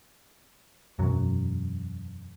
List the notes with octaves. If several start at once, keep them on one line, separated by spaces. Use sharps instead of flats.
E1 F#2 F#3